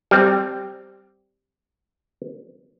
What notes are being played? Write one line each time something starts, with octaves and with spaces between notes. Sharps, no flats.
G3 C4